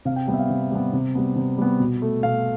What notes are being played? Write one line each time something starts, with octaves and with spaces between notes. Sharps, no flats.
C3 F5
G5
G3 B3 G5
E5
F5
C3
G3 B3
C3
G3 B3
C3
G3 B3
B2
A3
B2 F5